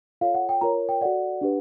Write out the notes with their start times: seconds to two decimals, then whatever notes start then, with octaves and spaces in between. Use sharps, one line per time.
0.21 F4 A4 C#5 F5
0.35 F#5
0.49 G5
0.61 F4 A#4 C#5 A#5
0.89 G5
1.01 F#4 A4 D5 F#5
1.41 D4 G4 B4